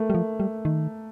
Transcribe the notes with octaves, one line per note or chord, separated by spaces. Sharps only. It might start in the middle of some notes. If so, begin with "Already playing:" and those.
Already playing: A3 A#3
G3
F3
G3
D#3